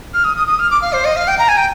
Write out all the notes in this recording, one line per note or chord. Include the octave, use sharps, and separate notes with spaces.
F6
D#6
D#6
D#6
F6
D6
F5
C5
D#5
F5
G5
A#5
G#5
G5